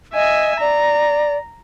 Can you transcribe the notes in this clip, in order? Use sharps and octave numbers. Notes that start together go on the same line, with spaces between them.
D#5 E5 G#5
D5 A#5